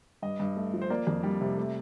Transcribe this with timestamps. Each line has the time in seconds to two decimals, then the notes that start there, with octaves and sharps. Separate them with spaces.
0.22 G2 D#5
0.40 G2
0.57 A3
0.74 F3
0.82 C5
0.90 A#3 D5
1.07 F2
1.23 G3
1.41 C3
1.57 A3